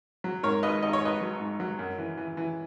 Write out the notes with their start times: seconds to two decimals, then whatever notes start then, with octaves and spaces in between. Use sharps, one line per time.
0.24 F#3
0.43 G#2 A#4 C#5
0.63 G#1 B4 D#5
0.82 G#1 D#5
0.93 C#5
1.01 G#1 B4 D#5
1.21 F#3
1.40 G#2
1.60 F#3
1.79 F#2
1.98 E3
2.18 E3
2.37 E3